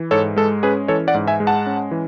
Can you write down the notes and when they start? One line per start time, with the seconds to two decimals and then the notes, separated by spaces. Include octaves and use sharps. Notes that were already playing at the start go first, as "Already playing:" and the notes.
Already playing: E3
0.11 G#2 A4 C#5
0.36 G#3 A4
0.63 C#4 G#4 B4
0.88 E3 A4 C#5
1.08 D5 F#5
1.14 G#2
1.27 E5 G#5
1.40 G#3
1.47 F#5 A5
1.66 C#4
1.91 E3